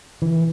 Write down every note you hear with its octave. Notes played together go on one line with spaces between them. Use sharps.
E3